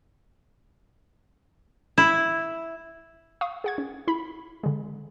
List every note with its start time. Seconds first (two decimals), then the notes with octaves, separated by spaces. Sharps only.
1.98 E4
3.41 F5 C#6 D#6
3.64 G#4 F#5 G#6
3.78 C#4
4.08 E4 B5
4.63 D3 G#3